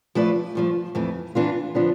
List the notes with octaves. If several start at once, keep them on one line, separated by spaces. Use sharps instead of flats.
F3 A3 E4 B4 D5
G2 F3 A3
F2 E3 A3
E3 B3 D4 F4
D3 F3 B3 D4